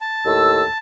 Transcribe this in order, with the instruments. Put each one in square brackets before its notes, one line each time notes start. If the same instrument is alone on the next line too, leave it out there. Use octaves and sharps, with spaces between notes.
[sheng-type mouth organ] A5
[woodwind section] D#2 A2 E6